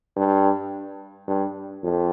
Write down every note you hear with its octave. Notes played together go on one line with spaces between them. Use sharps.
G2
G2
F2